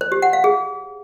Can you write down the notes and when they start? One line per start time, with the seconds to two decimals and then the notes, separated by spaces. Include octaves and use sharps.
0.01 C5
0.12 G4
0.22 F#5
0.33 F5
0.44 G#4